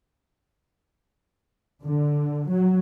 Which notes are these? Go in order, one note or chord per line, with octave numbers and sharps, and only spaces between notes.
D3
F#3